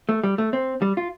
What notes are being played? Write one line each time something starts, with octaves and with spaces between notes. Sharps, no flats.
A3
G3
A3
C4
G3
F4